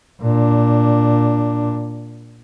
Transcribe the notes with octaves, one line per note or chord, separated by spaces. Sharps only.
A#2 D4